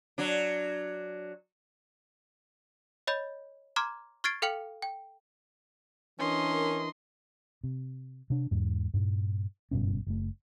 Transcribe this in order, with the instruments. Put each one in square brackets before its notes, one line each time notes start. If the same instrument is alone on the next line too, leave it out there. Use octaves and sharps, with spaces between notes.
[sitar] F#3 D4
[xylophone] C#5 D#5 B5 G6
A#5 C6 D6 F6 G#6
C#6 F6 G#6 A6 C7 D7
A4 F5 G5 F6 C#7 F#7
G5
[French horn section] E3 A#4 [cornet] C#4 [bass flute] D4 [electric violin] D#5 C6
[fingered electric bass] C3
C3 D4
E2 G#2
G2 A#2
F#1 G2 B2 C#4
F#1 A3